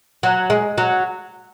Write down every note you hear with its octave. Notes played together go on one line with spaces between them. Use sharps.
F#3
G#3
F#3